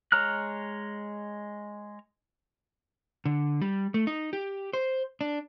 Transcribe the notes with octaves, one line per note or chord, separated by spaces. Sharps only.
G#3 C#5 A#5 F6 F#6
D3
G3
A3
D#4
G4
C5
D4